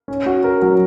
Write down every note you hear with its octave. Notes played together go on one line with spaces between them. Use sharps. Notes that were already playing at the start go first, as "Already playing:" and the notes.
C#4
F#4
A#4
F#3